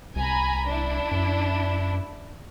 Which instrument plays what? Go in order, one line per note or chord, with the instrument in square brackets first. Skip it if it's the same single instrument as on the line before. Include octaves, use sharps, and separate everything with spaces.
[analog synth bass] C2 [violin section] G#5 A#5 B5
[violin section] D4 E4
[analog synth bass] F#2